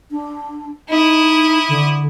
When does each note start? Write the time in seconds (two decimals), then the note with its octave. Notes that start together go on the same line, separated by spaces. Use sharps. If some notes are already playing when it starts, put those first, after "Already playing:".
0.11 D4
0.89 D#4 E4 D#6
1.68 D3